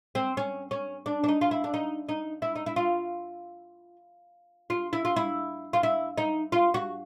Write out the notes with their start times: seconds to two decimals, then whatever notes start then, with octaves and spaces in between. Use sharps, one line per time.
0.15 C4
0.37 C#4
0.71 C#4
1.06 D4
1.24 D4
1.28 D#4
1.41 F4
1.51 E4
1.64 D4
1.74 D#4
2.09 D#4
2.42 E4
2.56 D#4
2.66 E4
2.76 F4
4.70 F4
4.93 E4
5.05 F4
5.16 E4
5.73 F4
5.83 E4
6.18 D#4
6.52 F4
6.74 F#4